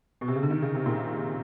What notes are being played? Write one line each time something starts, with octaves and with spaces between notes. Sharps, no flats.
B2
C3
C#3
D3
D#3
C#3
C3
A#2